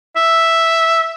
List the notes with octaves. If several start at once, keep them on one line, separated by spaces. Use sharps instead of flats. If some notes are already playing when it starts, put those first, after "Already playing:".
E5